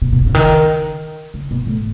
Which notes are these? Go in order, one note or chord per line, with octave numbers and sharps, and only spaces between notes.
B2
B2
C#3
D#3
C#3
B2
A2